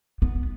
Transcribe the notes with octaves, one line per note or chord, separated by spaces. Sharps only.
B3